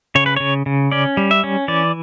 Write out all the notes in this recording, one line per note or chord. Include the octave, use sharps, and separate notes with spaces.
C#3 C#5
B4
C#3 C#5
C#3
C#4 D5
G3
E5
C#4
E3 D5